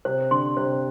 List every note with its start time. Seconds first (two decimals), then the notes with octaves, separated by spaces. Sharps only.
0.05 C3 C5
0.31 D3 C6
0.57 C3 C5